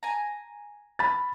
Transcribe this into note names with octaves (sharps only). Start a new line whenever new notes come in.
G#5 A#5
B5 A6